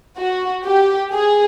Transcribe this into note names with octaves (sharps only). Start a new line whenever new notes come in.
F#4
G4
G#4